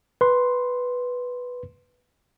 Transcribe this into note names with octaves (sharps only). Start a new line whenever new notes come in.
B4 C6